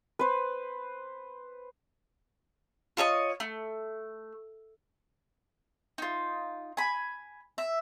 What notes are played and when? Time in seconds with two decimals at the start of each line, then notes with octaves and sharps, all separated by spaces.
0.19 B4 C5
2.97 F4 A4 C#5 D#5
3.40 A3
5.98 D#4 F4
6.77 G#5 B5
7.58 E5